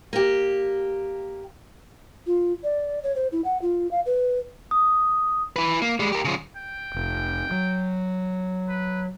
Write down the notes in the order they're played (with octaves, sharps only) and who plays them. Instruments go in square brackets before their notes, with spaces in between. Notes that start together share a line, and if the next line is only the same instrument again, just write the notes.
[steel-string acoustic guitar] A#3 G4
[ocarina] F4
D5
C#5
C5
E4
F#5
F4
F5
B4
[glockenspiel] D#6
[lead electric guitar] E4 B4
A#3
G3 G#3
G4 A#4
C#3 F3
[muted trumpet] G5
[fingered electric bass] F1
F#3
[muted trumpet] B4